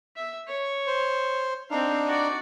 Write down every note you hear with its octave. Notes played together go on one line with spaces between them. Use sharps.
E5
C#5
C5
C4 D4 D#4 F5
F#4 D5